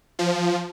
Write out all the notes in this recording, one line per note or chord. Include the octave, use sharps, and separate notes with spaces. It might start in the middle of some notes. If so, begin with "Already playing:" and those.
F3